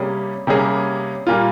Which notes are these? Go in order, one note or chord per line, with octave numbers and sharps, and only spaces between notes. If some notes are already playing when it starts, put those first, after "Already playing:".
Already playing: C3 G3 A#3 C#4 G#4
C3 G3 A#3 C#4 G#4
A#2 G3 A#3 F4